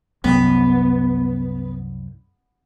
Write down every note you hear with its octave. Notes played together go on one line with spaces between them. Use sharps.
C2 F#2 B3